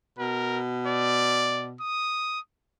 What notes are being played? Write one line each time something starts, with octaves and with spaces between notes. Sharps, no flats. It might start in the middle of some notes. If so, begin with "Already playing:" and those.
B2 A#4
D5
D#6